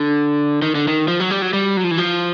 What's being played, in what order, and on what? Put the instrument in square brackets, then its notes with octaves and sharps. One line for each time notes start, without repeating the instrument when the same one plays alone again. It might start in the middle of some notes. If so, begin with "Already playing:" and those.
Already playing: [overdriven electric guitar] D3
D#3
D3
D#3
F3
F#3
G3
F#3
G3
F#3
F3
E3
F3